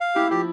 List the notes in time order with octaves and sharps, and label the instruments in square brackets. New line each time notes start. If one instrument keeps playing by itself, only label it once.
[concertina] F5
[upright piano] E4 [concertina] G4
[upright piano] F3 [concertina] G4